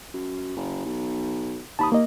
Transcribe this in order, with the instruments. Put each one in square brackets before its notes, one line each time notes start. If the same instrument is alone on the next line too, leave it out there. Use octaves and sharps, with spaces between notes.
[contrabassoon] F#2
F#1
B1
[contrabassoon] D#2 [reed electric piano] A5 B5 D#6
[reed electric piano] A#3 D#5